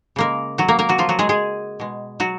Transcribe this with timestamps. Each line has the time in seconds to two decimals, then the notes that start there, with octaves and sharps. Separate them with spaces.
0.16 C#3 G#3 A#3 A#4
0.58 F#3 F#4
0.68 A#3 A#4
0.79 A#3 A#4
0.89 F#3 F#4
0.98 F3 F4
1.09 F#3 F#4
1.19 G#3 G#4
1.29 G#3 G#4
1.80 B2 G#3
2.20 F#3 F#4